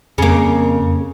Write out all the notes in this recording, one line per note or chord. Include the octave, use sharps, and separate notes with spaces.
F2 C#3 A#3